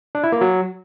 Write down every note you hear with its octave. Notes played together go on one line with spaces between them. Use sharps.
D4
E4
A#3
F#3